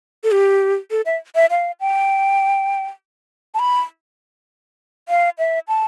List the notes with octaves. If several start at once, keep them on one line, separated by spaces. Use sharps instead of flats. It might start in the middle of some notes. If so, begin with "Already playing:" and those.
A4
G4
A4
E5
E5
F5
G5
A5
B5
F5
E5
A5